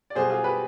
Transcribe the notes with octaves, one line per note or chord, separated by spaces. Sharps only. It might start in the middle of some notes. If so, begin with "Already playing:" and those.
D5
B2 G3 G#4 C5
F4 G#4
G4 B4